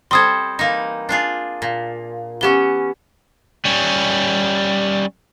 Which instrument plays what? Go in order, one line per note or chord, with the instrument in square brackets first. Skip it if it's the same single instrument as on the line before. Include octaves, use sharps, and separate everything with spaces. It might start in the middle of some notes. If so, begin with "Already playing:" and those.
[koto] G3 C4 A4 [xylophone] C6 D#6 G#6
[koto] E3 A#3 D#4
D4 F4 G#4
A#2
[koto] E3 B3 C#4 [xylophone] G4 G7
[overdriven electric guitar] G3 C#4